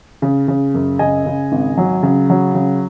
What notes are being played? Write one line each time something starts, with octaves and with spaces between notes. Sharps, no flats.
C#3
C#3
F#2
C#3 D#5 G#5
C#3
G#1
F#3
C#3
F#3
C#3